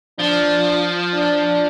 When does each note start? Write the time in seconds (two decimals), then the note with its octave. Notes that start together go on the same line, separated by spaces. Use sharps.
0.19 F3 D4
1.14 D4